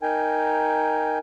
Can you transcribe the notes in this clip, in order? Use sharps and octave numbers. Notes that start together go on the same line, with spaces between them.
D#4 A#4 G5 G#5